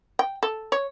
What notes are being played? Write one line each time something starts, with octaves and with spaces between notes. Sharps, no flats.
G5
A4
C#5